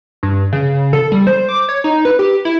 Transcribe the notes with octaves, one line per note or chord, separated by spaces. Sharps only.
G2
C#3
A4
G3
C5
D6
C#5
D#4
B4
G4
E4